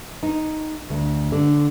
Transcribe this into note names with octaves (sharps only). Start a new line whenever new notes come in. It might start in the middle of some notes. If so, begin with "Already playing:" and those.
D#4
D2
D3